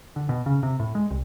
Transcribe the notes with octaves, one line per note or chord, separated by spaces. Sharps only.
D3
B2
C#3
C3
A2
G#3
C2